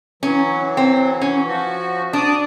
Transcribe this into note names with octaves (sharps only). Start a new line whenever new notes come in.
E3 F#3 C#4
C4
C#4
F3 F#4
D4 D5 D6 D#6